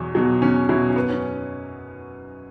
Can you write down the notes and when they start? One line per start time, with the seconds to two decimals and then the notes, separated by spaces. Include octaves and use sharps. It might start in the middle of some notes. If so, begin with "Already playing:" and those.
Already playing: E2 B2 F#3
0.15 B2 F#3
0.42 E2 C#4
0.69 B2 F#3 E4
0.90 C#4
0.96 F#2 B3
1.09 C#4